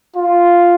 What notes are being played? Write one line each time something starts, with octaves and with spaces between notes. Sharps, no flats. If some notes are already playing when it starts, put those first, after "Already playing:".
F4